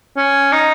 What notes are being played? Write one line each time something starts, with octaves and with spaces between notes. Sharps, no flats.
C#4
D#4